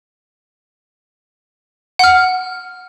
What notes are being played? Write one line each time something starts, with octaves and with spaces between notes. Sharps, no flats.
F#5 F6